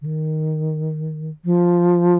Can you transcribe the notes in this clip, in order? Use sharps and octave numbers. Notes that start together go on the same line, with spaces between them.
D3
D#3
F3